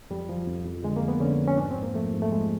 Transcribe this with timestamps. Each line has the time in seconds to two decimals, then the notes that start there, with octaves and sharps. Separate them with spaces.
0.10 F2 G3
0.29 F3
0.47 F2
0.66 F2
0.83 D3 G#3
0.96 A#3
1.02 F2
1.08 B3
1.20 D3 C#4
1.39 F2
1.47 C#4
1.57 G#2 D4
1.71 C4
1.76 G#2
1.83 A#3
1.94 F3 A3
2.13 G#2
2.22 A3
2.31 F3 G#3